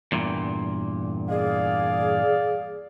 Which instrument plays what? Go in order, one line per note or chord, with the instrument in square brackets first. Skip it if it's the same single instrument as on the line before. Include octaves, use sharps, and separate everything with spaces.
[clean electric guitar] E2 G2 A#2
[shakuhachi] G#4 [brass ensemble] D5 F5